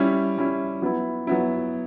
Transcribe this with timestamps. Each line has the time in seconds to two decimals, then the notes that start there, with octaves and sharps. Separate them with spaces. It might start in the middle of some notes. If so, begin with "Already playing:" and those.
Already playing: G3 C#4 E4
0.38 G3 C#4 E4
0.82 F#3 B3 E4
1.27 F#3 B3 E4